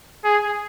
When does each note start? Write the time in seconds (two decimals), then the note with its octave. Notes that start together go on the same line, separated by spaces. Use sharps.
0.25 G#4